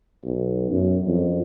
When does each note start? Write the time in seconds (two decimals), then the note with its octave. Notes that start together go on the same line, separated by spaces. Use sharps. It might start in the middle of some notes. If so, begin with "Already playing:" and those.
0.24 B1
0.70 F#2
1.07 F2